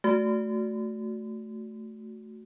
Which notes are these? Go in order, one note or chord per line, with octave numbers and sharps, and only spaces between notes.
A3 F#4